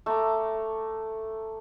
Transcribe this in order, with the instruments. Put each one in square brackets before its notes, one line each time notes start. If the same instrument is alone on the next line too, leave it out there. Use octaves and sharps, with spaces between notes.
[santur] A3 A#5 D6